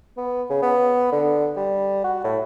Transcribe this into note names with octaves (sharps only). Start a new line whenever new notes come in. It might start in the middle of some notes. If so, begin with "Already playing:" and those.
B3
C#3
B3
D3
G3
F#4
A2